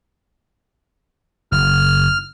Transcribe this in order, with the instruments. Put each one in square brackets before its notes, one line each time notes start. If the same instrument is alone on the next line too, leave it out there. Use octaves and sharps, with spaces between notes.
[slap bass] F#1 [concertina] F6